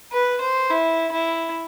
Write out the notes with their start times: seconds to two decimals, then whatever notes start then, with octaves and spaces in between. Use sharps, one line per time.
0.13 B4
0.41 C5
0.70 E4
1.12 E4